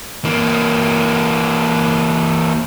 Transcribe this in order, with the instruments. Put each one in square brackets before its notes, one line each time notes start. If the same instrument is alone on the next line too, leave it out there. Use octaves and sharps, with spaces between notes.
[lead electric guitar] E3 A#3